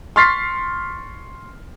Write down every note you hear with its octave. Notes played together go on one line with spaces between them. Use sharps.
C6 C#6 F6 A6 B6 C7